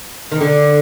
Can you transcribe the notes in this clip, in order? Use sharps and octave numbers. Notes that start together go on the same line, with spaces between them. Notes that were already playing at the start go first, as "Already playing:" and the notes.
D#3
D3